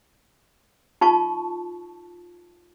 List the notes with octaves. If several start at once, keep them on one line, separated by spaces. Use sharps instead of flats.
D#4 F4 A5 C#6